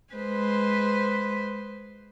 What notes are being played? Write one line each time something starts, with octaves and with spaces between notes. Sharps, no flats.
G#3 B4 C5